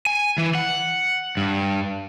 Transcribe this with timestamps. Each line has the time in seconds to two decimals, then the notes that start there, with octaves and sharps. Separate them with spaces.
0.06 G#5
0.38 E3
0.55 F#5
1.37 G2